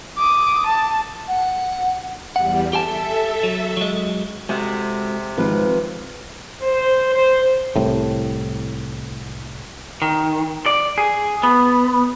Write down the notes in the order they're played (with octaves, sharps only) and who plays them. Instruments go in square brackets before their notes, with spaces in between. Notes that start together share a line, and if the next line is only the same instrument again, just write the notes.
[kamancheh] D6 D#6
A5
[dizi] F#5
[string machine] E2 G3 [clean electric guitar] F#5
[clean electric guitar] G4 G#5 A5 [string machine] A4 E5
[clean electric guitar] F#3
F#3 G#3
[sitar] C3 [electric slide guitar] G#3 F#4 A4
[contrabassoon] G#1 [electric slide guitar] F3 F4 [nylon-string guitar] B4
[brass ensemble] C5
C5
[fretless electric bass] C2 A2
[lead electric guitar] D#3
D5
G#4
B3